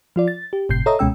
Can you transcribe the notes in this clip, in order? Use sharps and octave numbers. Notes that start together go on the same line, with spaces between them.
F3 F4 D5
A6
G4
G1 A2 C3 G6 C7
A4 C#5 D#5 E5 A#5 D#6
C#2 B2 G#3 C#4 G5 E6